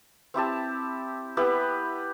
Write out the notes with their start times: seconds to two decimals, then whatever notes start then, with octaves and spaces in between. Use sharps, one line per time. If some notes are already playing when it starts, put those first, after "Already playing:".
0.34 C4 E4 G4 A5
1.37 B3 E4 G4 B4